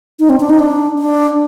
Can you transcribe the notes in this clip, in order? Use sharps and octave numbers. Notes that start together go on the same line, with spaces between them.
D#4
C4
D4
D#4
D4
D4